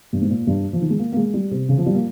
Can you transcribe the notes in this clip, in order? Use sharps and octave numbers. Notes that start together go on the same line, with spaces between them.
G2
G#2
A#2
G2
F3
D#3
G#3
A#3
A#3
G#3
G3
C3
C#3
F3
G3
A#3